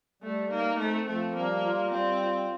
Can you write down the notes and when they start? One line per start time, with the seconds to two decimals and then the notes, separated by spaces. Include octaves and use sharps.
0.22 G3 A3
0.50 A#3 D#4
0.78 A3 C4
1.07 F3 A3
1.35 G3 A#3
1.64 F4
1.92 G3 C4
2.21 F4